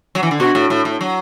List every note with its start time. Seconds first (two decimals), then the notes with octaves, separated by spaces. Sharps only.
0.15 F#3
0.23 E3
0.31 D3
0.40 B2 F#4
0.55 A2
0.70 A2
0.85 A2
1.01 F#3